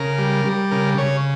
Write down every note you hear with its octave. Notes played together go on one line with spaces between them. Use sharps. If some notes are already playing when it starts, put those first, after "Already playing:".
Already playing: C#3 A#4
G3
G3
C#3 A#4
C#3 C#5